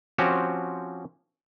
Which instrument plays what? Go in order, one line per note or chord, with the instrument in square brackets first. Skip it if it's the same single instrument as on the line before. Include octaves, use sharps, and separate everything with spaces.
[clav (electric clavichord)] F3 C4 C#4 F#4 G4